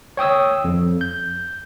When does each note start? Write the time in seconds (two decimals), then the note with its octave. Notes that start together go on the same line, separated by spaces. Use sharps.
0.17 C#5 G5 D#6 E6
0.64 F2
1.01 G6